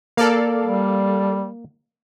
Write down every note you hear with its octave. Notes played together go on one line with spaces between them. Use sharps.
A#3 A4 D5 F5
G3